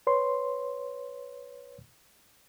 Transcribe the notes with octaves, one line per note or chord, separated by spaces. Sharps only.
B4 C#5 C6